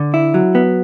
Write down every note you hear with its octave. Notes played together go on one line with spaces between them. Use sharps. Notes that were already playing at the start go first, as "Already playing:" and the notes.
Already playing: D3
E4
F#3
B3